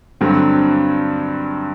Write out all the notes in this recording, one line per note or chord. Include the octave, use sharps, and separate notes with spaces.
G2 D3 F#3 C4